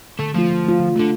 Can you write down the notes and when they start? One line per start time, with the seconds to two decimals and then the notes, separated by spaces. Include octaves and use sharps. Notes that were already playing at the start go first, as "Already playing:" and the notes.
0.19 D3 A3
0.35 F3 A3 F4
0.50 D3
0.65 A3 F4
0.79 D3
0.96 D3 A3 F4